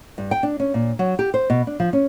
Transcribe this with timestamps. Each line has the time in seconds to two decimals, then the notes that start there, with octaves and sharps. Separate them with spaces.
0.18 G2
0.31 G5
0.43 D4
0.60 C#4
0.74 A#2
0.99 F#3
1.19 G4
1.34 C5
1.50 B2
1.67 D4
1.80 F3
1.93 C#4